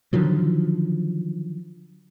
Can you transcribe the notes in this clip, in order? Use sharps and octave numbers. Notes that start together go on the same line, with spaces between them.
D3 D#3 F3 F#3